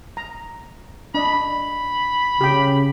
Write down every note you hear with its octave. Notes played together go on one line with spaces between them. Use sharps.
A#5
D4 D#5 B5
C#3 G4 G5